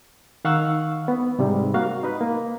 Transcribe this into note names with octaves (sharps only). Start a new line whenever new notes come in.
D#3 F5 F#5 C#6 E6
B3
G#2 C3 G3
A#3 F#4 F5
D#4 B4
A#3